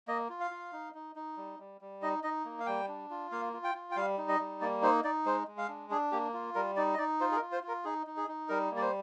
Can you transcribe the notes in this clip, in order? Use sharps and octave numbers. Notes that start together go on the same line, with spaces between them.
A#3 D#5
F4
F5
F4
D#4
D#4
D#4
G3
G3
G3
D#4 D#5
D#4 D#5
A#3
F5
G3 G5
D4
F4
A#3 F5
F4
G5
F4
G5
G3 F5
D#4
D#5
G3
A#3 D5
D#4 C5
D#4 D5
G#3 C5
G#3
F5
D4
D4 G#4
A#3 G4
F4
G3 A#4
D#4 D5
D#5
D#4 D5
F4 C5
G#4
A#4
F4
C5
F4 A#4
D#4 G#4
D#4
G#4
D#4
G3 A#4
A#3
D5
C5